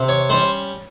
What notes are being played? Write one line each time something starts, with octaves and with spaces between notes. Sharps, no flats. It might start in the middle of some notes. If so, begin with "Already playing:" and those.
Already playing: C3
C#5
G3 C#4 C5